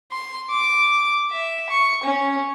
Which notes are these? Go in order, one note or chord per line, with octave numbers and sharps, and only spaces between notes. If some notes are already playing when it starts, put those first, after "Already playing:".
C6
D6
E5
C#6
C#4